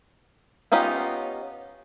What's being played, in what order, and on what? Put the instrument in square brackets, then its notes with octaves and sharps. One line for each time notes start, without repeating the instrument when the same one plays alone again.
[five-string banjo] B3 C#4 D#4 F4 G4